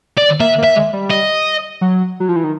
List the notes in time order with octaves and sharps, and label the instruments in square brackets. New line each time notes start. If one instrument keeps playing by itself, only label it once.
[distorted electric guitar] D5
[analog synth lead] A#3 [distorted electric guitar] E5
[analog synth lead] A#3
[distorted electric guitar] E5
[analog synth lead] G#3
G3
[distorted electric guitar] D#5
[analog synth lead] F#3
F#3
F3
E3
D#3